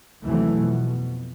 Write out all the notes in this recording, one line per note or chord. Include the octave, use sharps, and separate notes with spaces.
D#2 C3 E3 F#3 A3
F2 B2